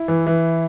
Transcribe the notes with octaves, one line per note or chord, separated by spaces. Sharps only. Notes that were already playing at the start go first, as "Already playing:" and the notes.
Already playing: E4
E3
E3